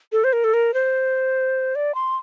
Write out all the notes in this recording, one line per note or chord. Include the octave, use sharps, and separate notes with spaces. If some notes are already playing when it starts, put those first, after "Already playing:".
A4
C5
A#4
A4
A#4
C5
D5
C6